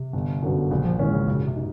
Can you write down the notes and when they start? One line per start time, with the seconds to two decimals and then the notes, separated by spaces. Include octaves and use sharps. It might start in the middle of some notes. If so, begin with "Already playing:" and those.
Already playing: C3
0.13 G1
0.42 F#2 D3 F#3 B3
0.71 A#1 C#3
0.85 F3
0.99 G#2 D#3 E3 G#3 C#4
1.13 C#3
1.28 F#2 C#3
1.47 C3
1.56 D#4